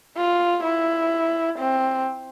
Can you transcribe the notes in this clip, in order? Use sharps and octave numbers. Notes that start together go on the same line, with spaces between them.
F4
E4
C4